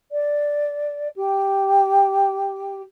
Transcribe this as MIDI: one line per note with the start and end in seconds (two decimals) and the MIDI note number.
0.12 1.08 74
1.16 2.82 67